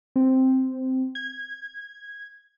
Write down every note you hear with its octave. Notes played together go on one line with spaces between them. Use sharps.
C4
G#6